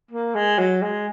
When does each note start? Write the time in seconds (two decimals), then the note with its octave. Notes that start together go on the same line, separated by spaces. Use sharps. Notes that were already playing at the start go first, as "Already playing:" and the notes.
0.11 A#3
0.35 G#3
0.59 F#3
0.82 G#3